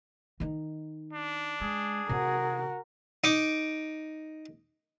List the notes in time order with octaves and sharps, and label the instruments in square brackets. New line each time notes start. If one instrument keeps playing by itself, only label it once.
[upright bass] D#3 D#4
[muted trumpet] D4
[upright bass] G#3 [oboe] G#4
[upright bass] C3 [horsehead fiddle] F#4 A#4
[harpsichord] D#4 D6